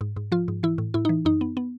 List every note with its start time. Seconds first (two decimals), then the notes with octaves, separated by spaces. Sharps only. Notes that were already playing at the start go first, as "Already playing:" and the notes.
0.01 G#2
0.16 G#2
0.32 F3 F4
0.48 G#2
0.63 E3 E4
0.78 A2
0.94 A2 E4
1.05 E3 D#4
1.25 F#2 D#4
1.41 B3
1.57 B3